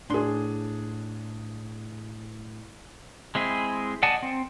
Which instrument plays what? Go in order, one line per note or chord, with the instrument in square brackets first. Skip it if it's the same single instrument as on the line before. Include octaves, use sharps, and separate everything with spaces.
[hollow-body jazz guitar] A2 C6 [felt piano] D4 G#4
[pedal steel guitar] G#3 C4 E4 G#4
D5 D#5 F#5 G#5 A5
C4